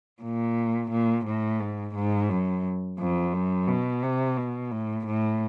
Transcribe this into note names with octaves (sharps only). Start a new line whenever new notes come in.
A#2
A#2
A2
G#2
G#2
F#2
F2
F#2
B2
C3
B2
A2
A2